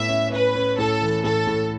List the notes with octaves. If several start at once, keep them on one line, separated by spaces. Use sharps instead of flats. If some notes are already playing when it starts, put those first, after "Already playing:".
Already playing: A2 B3 E5
C#4
C#4 B4
C#4
A2 A4
E3
A2 A4
A2